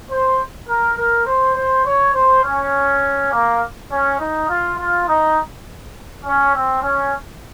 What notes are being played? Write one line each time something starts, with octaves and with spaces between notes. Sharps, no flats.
C5
A#4
A#4
C5
C5
C#5
C5
C#4
A#3
C#4
D#4
F4
F4
D#4
C#4
C4
C#4